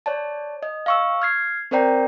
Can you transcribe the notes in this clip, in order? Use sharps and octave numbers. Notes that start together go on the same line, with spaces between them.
C#5 D5 A5
D#5
F5 C#6 E6
F6 G#6 C7
C4 A#4 C5 D5 G5 A#5